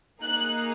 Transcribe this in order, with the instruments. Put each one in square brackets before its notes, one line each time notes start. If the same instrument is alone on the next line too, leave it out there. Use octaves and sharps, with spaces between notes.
[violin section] A#3 D#4 G#4 F#6